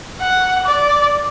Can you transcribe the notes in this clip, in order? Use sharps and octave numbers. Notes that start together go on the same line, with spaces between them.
F#5
D5